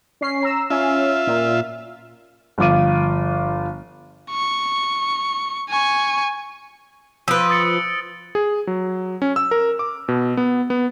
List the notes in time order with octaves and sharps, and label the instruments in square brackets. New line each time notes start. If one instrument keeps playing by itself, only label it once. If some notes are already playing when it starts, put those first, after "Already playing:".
[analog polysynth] C#4 C7
A#5 E6
[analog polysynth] C#4 [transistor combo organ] F4 E5
[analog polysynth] A#2
[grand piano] G1 F3 F4 D6 D#7
[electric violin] C#6
G#5 C#6
[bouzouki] F3 B4 [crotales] E6 D7
[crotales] D#6 A6 C#7
[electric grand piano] G#4
F#3
C#4
E6
A#4
D6
B2
B3
B3